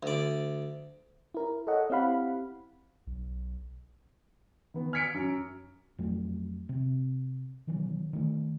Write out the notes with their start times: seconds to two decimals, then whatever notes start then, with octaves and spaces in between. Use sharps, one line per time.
0.03 D2 D5
1.34 E4 A#4
1.67 A4 C#5 D#5 F#5
1.90 C4 E4 G4 F5 F#5 B5
3.07 B1
4.74 D#3 B3
4.93 F6 G#6 B6 C#7 D7
5.14 F#2
5.98 F2 F#3 A3
6.69 C3
7.67 B2 D#3 E3 F#3
8.13 D#3 A3